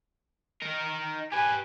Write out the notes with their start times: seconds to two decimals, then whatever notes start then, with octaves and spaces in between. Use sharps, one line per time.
0.62 D#4 A#4
1.32 G4 B4 G#5